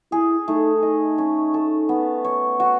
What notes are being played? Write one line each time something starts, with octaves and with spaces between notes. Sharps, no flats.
E4 G#4
A3 D#4
D#4 D#5
C#4
A4
B3
C#5
F#4